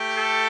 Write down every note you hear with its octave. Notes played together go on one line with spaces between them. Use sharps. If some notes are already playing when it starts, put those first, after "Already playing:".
Already playing: A3 G4
A4